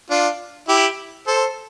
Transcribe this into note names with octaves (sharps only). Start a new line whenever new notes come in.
D4 F4
E4 G4
A4 C5